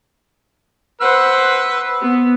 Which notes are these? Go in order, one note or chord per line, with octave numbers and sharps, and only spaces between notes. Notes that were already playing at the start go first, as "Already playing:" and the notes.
B4 C5 F#5 E6
B3